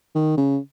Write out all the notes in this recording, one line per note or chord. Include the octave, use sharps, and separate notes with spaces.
D#3
C#3